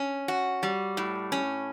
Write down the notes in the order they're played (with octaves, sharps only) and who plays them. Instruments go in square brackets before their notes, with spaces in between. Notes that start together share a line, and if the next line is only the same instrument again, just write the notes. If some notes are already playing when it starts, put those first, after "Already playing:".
Already playing: [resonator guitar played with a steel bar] C#4
F#4
G3
A2
C#4